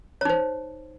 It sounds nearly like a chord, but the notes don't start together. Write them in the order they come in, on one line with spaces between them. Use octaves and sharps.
C#5 D#4 C5